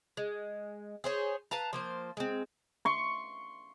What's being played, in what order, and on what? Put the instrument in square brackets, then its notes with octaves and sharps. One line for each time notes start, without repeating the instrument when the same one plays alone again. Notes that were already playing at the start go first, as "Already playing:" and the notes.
[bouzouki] G#3
G#4 C5 C#5
B4 F5 A5 A#5
F3 A#3 C5
G#3 C4
[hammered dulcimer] C6 C#6